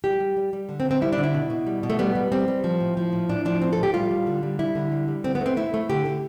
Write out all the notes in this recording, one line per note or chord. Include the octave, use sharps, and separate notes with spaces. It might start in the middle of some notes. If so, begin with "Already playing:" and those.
G3 G4
G3
G3
G3
D3
C4
D3
C4
G3 E4
D4
D3
E4
B2
B2
G3
B2
A3
G3 B3
G3
G3 C4
G3
F3
A2
F3
A2
A2 D4
F3 D4
A2 C4
A4
A2
G4
G3 F4
G3
D3
G3
G3 E4
D3
G3
G3
D3 C4
B3
A3 C4
A3 E4
A3
D3 G4
D3